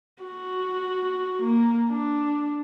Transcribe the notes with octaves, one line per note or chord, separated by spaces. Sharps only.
F#4
A#3
D4